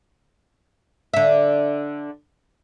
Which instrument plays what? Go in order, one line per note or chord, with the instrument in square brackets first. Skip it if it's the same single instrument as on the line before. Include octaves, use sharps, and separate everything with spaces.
[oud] D3 E5